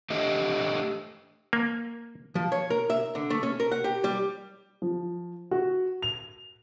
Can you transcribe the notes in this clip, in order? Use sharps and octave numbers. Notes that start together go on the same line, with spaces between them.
A3 D4 G4 D#5
A#3
F3
C#5
A#4
E5
D3
A3
C#4
A#4
F#5
G4
G3
F3
F#4
F7